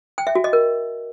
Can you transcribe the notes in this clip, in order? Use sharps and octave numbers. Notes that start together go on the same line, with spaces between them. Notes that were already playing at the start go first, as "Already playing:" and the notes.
G5
E5
F#4
D#5
A#4